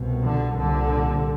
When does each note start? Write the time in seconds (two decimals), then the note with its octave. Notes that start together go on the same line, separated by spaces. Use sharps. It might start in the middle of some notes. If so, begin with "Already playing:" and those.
Already playing: C2 B2
0.24 D3
0.57 C2 A#2 D3